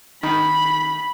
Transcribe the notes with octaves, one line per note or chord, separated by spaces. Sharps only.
D#3 B5